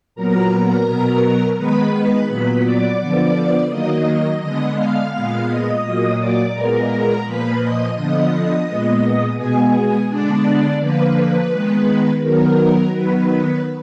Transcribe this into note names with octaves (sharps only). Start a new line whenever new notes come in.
A#2 F#3 B3 A#4 A#5
B2 F#3 B3
D#3 G#3 B3 B4 B5
B4 B5
A#2 F#3 B3 B4 B5
D5 D6
D3 F3 B3 D5 D6
D#3 F#3 A#3 D#5 D#6
D3 G#3 B3 D#5 D#6
F5 F6
A#2 G#3 B3 F5 F6
D#5 D#6
A#2 F#3 A#3 D#5 D#6
D5 D6
A#2 G#3 B3 A#4 A#5
A#2 F3 A#3 B4 B5
D#5 D#6
D3 F3 B3 D#5 D#6
A#2 G#3 B3
B2 G#3 B3 G#4 G#5
D3 G#3 B3 D4 D5
D3 F3 A#3 B4
D#3 G#3 B3
D#3 F#3 B3 A#4
D#3 F#3 B3 B4